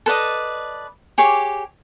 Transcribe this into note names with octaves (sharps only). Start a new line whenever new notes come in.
A4 B4 D5 D#5
G4 G#4 C#5 D6